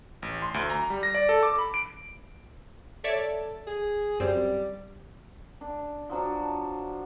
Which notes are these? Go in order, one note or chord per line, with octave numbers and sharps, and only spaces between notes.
A1
C6
D2
A#5
G3
A#6
D5
A4
D6
B5
D7
A4 C#5 D5 E5
G#4
F#2 G3 C4
D4
F3 F#3 D4